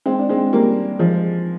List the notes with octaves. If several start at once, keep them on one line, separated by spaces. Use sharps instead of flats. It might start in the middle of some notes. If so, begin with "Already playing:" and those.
G#3 C4
D4
G#3 C4
G3 A#3
F3 G#3